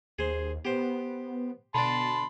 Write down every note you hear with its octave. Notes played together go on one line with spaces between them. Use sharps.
D#2 G#4 C5
B3 G4 C5
B2 D3 D4 A5 B5 C6